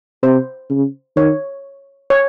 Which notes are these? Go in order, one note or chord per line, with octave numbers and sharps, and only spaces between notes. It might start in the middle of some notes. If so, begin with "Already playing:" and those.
C3 C5
C#3
D#3 C#5
C#5